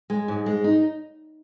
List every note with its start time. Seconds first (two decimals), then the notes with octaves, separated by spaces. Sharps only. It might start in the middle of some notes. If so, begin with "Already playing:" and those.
0.10 G#3
0.28 G#2
0.46 G#3
0.64 D#4